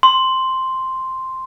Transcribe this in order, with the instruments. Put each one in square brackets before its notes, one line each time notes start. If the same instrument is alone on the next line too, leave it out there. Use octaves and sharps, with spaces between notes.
[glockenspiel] C6